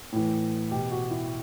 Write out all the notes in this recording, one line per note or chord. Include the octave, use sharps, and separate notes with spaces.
A2 E3
B2 G4
F#4
E4